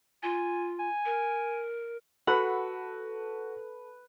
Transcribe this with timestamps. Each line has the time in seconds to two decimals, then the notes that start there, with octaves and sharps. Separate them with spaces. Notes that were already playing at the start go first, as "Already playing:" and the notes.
0.23 F4 G#5
0.79 G#5
1.05 A#4
2.27 F#4 A4 B4 F#5 B5